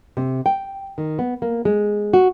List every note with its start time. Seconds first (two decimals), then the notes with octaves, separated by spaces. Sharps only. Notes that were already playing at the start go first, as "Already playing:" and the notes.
0.17 C3
0.46 G5
0.98 D#3
1.19 B3
1.42 A#3
1.65 G#3
2.14 F#4